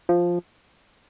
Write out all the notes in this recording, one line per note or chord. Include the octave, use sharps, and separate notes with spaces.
F3